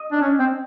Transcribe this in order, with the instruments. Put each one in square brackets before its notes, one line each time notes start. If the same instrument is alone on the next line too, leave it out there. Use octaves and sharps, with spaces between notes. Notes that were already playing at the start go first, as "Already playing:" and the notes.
Already playing: [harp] D#5
[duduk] D4
C#4
C4